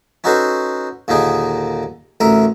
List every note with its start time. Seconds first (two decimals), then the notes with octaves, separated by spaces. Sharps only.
0.24 C#4 D#4 F#4 A4 B4 C5
1.08 D#2 A#2 D3 D#4 G#4
2.20 A1 D2 A#4 E5 A#5